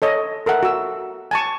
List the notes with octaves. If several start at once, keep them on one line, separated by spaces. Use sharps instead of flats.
A4 C#5 D#5
A4 A#4 E5 F#5
F#4 E6
G#5 A5 C#6